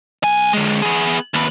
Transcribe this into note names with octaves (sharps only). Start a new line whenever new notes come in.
B1 G#5
D3 G#3
B3 G#4
D#2 B4